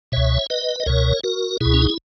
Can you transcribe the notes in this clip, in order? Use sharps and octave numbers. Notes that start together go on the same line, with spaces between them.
C#2 B2 C#5 E5
B4 D#5
D#5
C#2 B2 A#4 C#5
F#4 A#4
C#2 B2 E4 G#4
C#4
D#4
E4